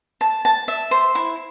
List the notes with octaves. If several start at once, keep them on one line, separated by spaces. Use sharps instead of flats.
A5
A5
E5
C5
E4